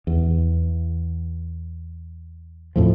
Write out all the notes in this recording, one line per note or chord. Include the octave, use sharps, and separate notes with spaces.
E2
F2 A2 F3